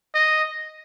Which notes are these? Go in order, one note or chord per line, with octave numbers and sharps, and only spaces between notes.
D#5